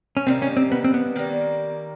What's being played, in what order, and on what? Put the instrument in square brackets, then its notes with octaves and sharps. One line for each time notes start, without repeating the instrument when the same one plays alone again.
[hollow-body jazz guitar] C#4
[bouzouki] C3 D#3 G3 A#3 [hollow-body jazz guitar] C4
[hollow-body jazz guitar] C#4
C4
B3
C4
B3
[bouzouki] D#3 G3 A#3